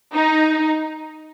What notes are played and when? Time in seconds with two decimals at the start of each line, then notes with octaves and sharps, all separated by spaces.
0.15 D#4